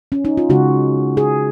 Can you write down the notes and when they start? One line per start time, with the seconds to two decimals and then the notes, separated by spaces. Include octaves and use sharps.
0.12 C#4
0.25 D#4
0.37 F4
0.50 C#3 G#3 F#4
1.17 G#4